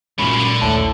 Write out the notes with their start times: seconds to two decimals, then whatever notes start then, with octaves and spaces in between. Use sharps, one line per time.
0.19 F#2 A#2 C#3 F3 G#3 B5
0.37 D3
0.62 A#1 D#2 A2 A5 G7